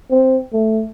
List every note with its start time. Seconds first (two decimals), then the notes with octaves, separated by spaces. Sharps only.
0.11 C4
0.53 A3